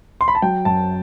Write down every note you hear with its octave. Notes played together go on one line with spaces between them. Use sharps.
C6
B5
A5
F#3 G5
F#2 A5